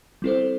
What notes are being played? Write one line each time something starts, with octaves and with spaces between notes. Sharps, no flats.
G3 C4 E4 A4 C5